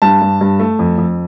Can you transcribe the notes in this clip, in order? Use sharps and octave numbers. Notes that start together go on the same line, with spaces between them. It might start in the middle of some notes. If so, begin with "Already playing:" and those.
G2 A5
G2
G2
A3
F2
F2